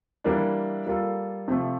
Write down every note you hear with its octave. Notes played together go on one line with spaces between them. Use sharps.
E3 G3 A#3 D4
G3 A#3 F4 A4
C3 F3 A3